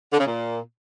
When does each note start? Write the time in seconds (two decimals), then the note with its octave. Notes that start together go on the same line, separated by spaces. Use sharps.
0.12 D3
0.19 C#3
0.26 A#2